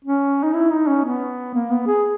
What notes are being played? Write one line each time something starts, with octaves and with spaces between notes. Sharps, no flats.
C#4
D#4
E4
D#4
C#4
B3
A#3
B3
G#4